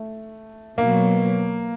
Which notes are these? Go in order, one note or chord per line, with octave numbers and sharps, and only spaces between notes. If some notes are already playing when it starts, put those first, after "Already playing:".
Already playing: A3
B2 F#3 A#3